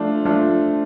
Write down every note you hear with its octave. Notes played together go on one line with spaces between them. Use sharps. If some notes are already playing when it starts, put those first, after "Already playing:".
Already playing: F3 A3 D4 F4
F3 A3 D4 F4